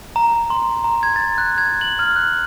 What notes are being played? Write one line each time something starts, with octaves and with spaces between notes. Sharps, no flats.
A#5
C6
A#5
G#6
A6
F#6
G#6
F#7
F6
F#6